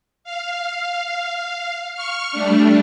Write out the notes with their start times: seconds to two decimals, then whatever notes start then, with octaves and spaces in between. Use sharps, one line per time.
0.24 F5
1.93 C#6 F6
2.32 G3 A3 D4